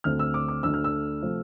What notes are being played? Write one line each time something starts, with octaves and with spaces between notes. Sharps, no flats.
D2 D3 A3 C4 F6
E6
D6
D6
D2 D3 A3 E6
F6
E6
C3 F3 A3 C4